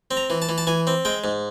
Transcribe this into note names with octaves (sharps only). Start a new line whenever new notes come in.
C4
A#5
E3
A5
E3
A5
E3 G#5
C4
G#3 G5
G#2